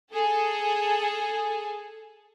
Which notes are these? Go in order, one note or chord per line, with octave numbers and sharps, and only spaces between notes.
G#4 A4